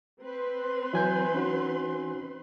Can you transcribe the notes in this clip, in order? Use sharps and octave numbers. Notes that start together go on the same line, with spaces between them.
C4 B4 C6
E3 F#3 G#5 G6
C#4 D#4 F#4